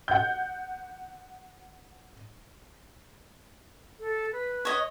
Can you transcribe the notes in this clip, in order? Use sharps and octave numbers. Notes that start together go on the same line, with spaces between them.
F#5 G6
A4
B4
C#5 D#5